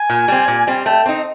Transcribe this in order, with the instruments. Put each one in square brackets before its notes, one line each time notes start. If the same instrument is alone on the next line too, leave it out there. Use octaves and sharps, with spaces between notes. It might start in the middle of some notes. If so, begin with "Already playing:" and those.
Already playing: [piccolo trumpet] G#5
[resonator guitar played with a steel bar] A#2
G3 C4
A#2
G3 C4
[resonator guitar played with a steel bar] A3 [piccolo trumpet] G5
[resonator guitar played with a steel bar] C4 D#4